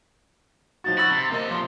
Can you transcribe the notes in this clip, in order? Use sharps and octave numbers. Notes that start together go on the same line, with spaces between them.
F3 D#4 F#4 A6
F#4 B5 C#6 E6
C3
C3 A#3 A4 A#4 D#5
F3 C6